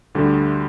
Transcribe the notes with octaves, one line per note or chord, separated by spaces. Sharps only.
D2 D3 G3